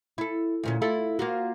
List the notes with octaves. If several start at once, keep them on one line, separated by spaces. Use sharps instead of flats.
E4 A4
D2 A#2 C#4
E4 F4 A4
A#3 F4 F#4